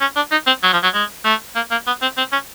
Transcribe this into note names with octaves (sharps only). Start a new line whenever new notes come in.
C#4
D4
D#4
C4
F#3
F3
F#3
G#3
A3
A#3
A#3
B3
C4
C4
C#4